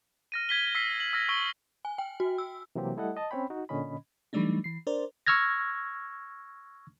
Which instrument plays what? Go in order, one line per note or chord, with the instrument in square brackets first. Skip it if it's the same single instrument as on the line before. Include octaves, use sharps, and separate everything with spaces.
[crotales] F6 A#6 D#7
G#6 B6 G7
E6 F6 B6 C7
F#7
E6 F6 A#6
C#6 E6 G7
[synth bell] G#5
G5
F#4
E6
[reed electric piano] C3 E3 F#3 A#3 C4 G4
G3 A3 E4 A4 D#5 F#5
D#5 A5
C4 C#4 C#5 G5 B5
D#4 F#4
A#2 D3 C#4 D#5 B5
[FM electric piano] E3 F#3 G3 A3 D4 D#4
E3 C7
D4 A#4 C5 D5
[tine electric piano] C#6 E6 F6 G#6 A#6